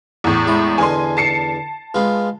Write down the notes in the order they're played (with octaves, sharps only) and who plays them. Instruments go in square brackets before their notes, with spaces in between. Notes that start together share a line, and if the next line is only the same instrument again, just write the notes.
[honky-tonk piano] E2 A2
[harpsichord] G#3 E4
[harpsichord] E2 D3 D#5 [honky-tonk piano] G#5 C6
[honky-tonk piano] A5 C7 C#7
[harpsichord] G#3 B3 F4